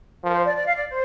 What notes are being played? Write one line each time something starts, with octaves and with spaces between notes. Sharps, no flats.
F3 A#4
C5
D5
D5
F5
D5
C5